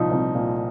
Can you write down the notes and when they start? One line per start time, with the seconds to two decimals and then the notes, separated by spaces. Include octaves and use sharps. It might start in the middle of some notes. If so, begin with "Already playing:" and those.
Already playing: C2 A#2 F3 D#4
0.12 C2
0.35 A#2